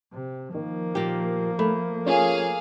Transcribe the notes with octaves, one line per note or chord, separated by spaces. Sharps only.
C3
D#3 F3 A#3
A#2 G4
A3 B5
C#4 F4 G#4 A#4 F5